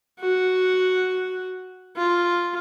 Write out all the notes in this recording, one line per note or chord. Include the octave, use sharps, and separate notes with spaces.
F#4
F4